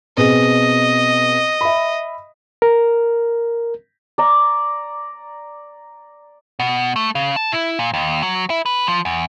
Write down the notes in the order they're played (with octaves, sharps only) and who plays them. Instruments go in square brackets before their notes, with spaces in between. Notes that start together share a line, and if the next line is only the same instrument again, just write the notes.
[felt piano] B2 C4 G#4 [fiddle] D#5
[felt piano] E5 B5
[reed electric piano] A#4
[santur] D5 A#5
[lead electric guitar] B2
A3
C#3
A5
E4
A#2
D#2
F#3
E4
B4
F3
E2